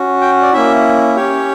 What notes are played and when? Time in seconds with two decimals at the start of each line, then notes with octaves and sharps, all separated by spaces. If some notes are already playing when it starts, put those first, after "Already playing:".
Already playing: C#4 F#4
0.21 G5
0.42 D5
0.53 A#3 C#4 E4 E5
1.16 C#4 G4 C#5